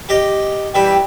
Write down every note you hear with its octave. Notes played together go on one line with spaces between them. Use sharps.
G4 D#5
E3 G3 E5 G5